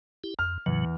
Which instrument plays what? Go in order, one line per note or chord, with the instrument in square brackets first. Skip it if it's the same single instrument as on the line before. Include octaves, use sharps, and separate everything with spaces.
[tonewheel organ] E4 G4
[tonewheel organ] F2 [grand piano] F6
[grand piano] E2 [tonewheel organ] A2 C#3 F#3